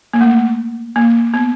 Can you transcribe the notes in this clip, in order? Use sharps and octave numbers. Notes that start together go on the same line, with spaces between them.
A#3
A3
A#3
B3